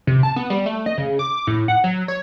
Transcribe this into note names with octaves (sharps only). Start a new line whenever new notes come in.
C3
A5
B3
G3
A3
D#5
C#3
D6
A2
F#5
F#3
C#5